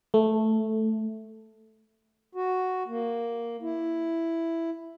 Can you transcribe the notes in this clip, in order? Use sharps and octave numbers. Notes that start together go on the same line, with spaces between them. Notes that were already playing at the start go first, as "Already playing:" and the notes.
A3
F#4
A#3
E4